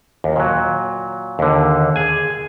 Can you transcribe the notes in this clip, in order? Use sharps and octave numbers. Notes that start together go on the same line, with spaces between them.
D#2
A#2 F#3
D#2 D3
G#4 G#5